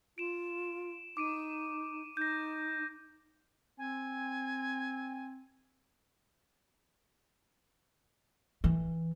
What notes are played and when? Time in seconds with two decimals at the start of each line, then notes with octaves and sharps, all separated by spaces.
0.18 F4 D7 E7
1.17 D#4 D6 D7 D#7
2.17 D#4 G6 A#6
3.78 C4 G#5
8.64 E3